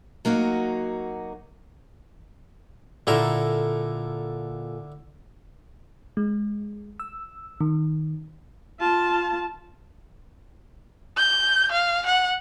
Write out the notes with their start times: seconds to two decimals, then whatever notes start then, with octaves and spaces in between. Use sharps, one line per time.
0.25 F#3 A#3 D#4 F#4
3.07 A#2 D3 E4 A4 A#4
6.17 G#3
7.00 E6
7.61 D#3
8.80 F4 A5
11.17 G6
11.71 F5
12.06 F#5